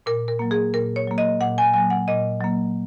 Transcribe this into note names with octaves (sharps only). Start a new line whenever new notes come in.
A#2 A#4
A#4
F#3 A#3
G#4
A#2 A#4
C#5
F#3 A#3
D#5
A#2 F#5
G#5
F#3 A#3 G#5
F#5
A#2 D#5
F#3 A#3